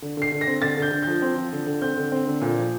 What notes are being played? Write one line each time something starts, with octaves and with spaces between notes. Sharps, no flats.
D3
D3 C7
D3
A#6
C4
D3 A6
D3
G6
D3
F3 G6
C4
F3
D3
D3
C4 G6
D3
C4
D3
A#2
F3